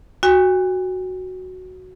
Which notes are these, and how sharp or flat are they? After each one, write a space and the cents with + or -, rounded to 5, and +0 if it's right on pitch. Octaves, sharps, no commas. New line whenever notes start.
F#4 +0 G#5 -45